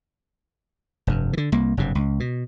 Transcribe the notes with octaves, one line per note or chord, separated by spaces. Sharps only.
F1 G2
D3 E3
C2 A#3
F#1 G2 C3
C#2
B2